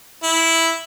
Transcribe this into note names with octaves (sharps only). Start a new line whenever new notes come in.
E4